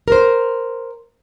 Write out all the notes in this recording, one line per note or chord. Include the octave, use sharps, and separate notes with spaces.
A#4 C5